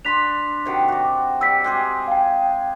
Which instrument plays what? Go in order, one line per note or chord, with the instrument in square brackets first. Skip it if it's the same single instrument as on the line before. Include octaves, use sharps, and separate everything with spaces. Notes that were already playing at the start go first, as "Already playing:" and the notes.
[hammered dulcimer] D4 B5 C6 [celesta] B6 F7
[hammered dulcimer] C3 D#3 F#4
F#4 D5
[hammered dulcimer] G3 [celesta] E6 B6
[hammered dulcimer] G#3 G4 G#4
[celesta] F5 G5